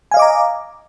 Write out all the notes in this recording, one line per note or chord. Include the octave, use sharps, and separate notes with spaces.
D#5 F5 G#5 A#5 D6